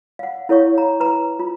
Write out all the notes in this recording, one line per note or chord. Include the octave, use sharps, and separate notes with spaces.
F5 F#5
E4 A4 C#5 F5 C#6
A#5
B4 A#5
F4